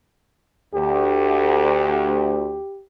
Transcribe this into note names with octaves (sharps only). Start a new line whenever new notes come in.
D2 G4